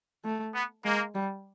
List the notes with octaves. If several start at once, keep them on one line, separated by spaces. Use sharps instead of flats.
A3
B3
G#3 A#3
G3